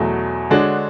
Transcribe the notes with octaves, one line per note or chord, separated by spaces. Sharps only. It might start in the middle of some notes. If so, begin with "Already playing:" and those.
Already playing: E2 B2 F#3 A3
D3 G#3 D4 F#4 C#5